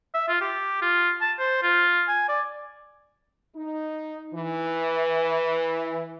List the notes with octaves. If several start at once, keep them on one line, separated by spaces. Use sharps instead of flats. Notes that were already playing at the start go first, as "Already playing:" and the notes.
E5
F4
G4
F4
A5
C5
F4
G#5
D5
D#4
E3